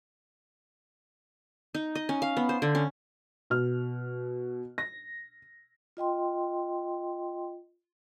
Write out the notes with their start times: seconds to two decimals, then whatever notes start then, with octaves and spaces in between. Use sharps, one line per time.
1.75 D#4
1.95 D#5
2.09 C#4
2.22 F5
2.37 B3
2.49 C5
2.62 D3
2.75 C#4
3.50 B2 F6
4.78 A#6
5.97 F4 D#5 G5 C6